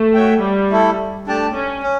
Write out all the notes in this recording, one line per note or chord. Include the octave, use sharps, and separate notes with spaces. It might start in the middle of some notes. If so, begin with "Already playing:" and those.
Already playing: A3
F#4 C#5 E5 G5
G3
A3 E4 A4
A3 D4 G4 D5 A5
C#4
C#4